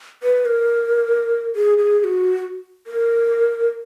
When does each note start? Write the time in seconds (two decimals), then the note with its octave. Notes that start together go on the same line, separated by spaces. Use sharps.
0.23 B4
0.45 A#4
1.56 G#4
1.78 G#4
2.00 G#4
2.04 F#4
2.87 A#4